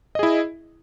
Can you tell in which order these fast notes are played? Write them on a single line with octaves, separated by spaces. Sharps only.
D#5 G#4 E4